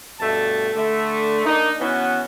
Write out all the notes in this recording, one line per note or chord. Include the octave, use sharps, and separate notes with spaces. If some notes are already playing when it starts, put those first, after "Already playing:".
G2 B2 A3 A5
D3 A3
A#3 D4 D#4
E3 B3 C#4 E4 F#4